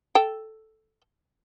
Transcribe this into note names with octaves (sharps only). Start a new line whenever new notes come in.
A4 G5